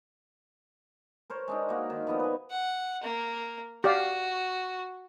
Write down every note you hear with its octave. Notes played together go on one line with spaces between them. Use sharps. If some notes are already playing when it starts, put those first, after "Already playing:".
A#4 C5 C#5
G#3 D4 D#4
A#3 F#4
D#3
F3 B3 D4 D#4
B4 G#5
F#5
A#3
F#4 G4 D5 F5